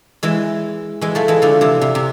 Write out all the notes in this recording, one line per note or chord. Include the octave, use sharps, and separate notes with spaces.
E3 G#3
E3 G#3
F3 A3
E3 G#3
D3 F3
C3 E3
C3
C3